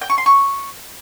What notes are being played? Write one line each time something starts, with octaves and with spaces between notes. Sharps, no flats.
G5
C#6
C6
C#6